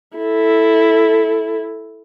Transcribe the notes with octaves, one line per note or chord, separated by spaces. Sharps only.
E4 A4